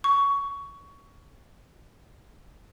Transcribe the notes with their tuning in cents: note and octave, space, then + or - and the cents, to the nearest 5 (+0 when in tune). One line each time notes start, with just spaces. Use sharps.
C#6 +15